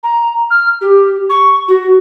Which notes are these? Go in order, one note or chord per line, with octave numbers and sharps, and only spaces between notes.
A#5
F6
G4
C#6
F#4